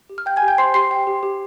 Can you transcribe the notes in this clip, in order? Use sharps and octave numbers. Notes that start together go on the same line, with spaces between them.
G4
F6
F5 G5 G6
G#5 G#6
G4
G5 G6
C5 C6 C7
G4 C6 C7
G5
G4
G4